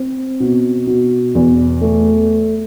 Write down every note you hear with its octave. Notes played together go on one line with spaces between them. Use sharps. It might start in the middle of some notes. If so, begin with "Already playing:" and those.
Already playing: C4
B2
B2
E2
A3